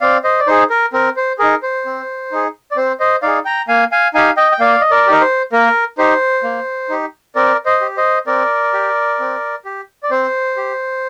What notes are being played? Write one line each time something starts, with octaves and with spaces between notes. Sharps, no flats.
C4 D5 F5
C5 D#5
D5
D#4 G#4 C5
A#4
C4 A#4
C5
D#4 G#4 A#4
C5
C4
D#4 G#4
D5
C4 C5
C5 D#5
D#4 G#4 D5 F5
G5 A#5
A#3 F5 G#5
F5 G#5
D#4 G4 F5 G#5
D#5 G5
G5
A#3 D5 F5
D#5
A#4 D5
D#4 G4 A#4
C5
A#3 A#4
D#4 G4 C5
A#3
D#4 G4
C4 A#4 D5
C5 D#5
G4
C5 D#5
C4 A#4 D5
G4
C4
G4
D5
C4 C5
G4